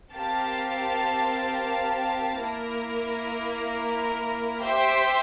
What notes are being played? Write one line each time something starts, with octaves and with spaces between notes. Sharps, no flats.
C4 G4 A#4 F5 A5
A#3 E4 A#4
G4 C5 E5 G5